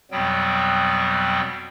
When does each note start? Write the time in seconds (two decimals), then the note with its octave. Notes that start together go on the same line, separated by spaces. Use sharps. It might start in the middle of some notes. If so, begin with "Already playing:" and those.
0.11 F2 B2 F#3 G3 B3 G5